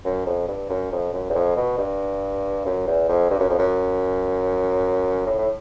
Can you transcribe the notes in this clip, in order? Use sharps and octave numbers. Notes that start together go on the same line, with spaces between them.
F#2
F2
G2
F#2
F2
F#2
E2
F2
B2
G2
F#2
E2
F2
G2
F#2
F2
F#2
A2
A2